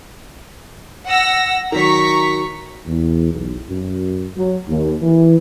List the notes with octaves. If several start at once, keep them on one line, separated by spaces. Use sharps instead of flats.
F#5 E6 A#6
D#3 F#3 A#5 C#6 B6
E2
B1
F#2
F#3
D#2
E3